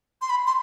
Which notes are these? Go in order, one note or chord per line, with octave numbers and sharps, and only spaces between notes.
C6
B5
C6